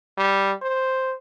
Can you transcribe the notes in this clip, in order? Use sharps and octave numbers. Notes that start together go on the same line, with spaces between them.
G3
C5